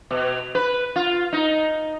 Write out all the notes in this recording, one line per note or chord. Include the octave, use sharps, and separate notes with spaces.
B2
B4
F4
D#4